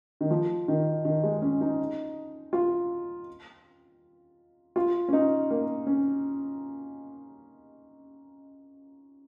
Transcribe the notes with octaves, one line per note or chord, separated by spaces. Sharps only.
D#3
F3
D#3
D#3
G#3
C#4
D#4
F4
F4
C#4
D#4
A#3
C#4